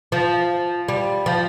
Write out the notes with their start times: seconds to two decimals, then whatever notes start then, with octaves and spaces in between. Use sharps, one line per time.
0.12 F3
0.88 G3
1.26 F3